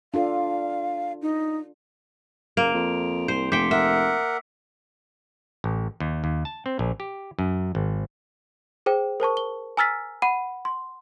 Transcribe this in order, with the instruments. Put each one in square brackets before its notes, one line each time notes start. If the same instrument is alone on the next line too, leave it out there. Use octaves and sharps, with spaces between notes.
[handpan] D4 F4 A4 [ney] F5
[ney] D#4
[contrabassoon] F#1 [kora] A#3 [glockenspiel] D7 F7
[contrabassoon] F2
[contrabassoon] C2 [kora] C5
[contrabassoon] F1 [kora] C5 G5 [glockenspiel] D6 B6 C#7
[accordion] A#4 F#5 [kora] E5 [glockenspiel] E6 B6
[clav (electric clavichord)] A1
D#2
D#2
A5
C4
A#1
G4
F#2
G#1
[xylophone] G#4 C5 G5
A#4 C5 A5 C#6
G7
G#5 A#5 E6 F6 A6 B6
F#5 B5 D#7
C6